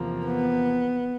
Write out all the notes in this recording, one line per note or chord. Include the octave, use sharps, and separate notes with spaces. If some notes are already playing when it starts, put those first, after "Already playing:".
Already playing: E2 C3 F3 A#3
B3